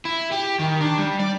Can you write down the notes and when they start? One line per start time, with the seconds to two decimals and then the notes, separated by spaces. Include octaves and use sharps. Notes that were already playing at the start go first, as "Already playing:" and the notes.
0.05 E4
0.32 G4
0.59 D#3
0.81 D4
0.98 G3
1.20 D5